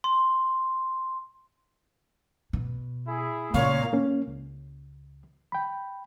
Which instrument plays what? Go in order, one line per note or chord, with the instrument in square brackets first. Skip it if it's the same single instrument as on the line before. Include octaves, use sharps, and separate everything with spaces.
[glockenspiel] C6
[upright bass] B2
[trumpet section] E4 G#4
[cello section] A#2 [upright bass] C#3 [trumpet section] C#5 [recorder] F5
[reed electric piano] A#3 C#4
C#2
G5 B5